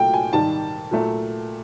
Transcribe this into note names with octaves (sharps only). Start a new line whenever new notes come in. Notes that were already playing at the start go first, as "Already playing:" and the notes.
Already playing: A#2 F#3 A3 G5
G#5
G#2 D#3 G3 A5
A#2 F#3 A3